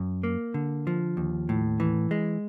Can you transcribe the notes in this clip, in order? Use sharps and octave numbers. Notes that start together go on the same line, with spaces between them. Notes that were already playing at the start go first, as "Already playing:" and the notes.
Already playing: F#2
A#3
D3
F3
D#2
A2
E3
G#3